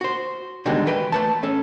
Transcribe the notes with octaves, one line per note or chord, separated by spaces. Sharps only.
F#4 C5
B2 D3 D#3 G3 G#3 F#4
E3 B4 G5
A3 B4 A5
C#4 A4